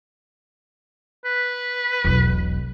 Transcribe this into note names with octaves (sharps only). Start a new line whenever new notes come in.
B4
E1 B1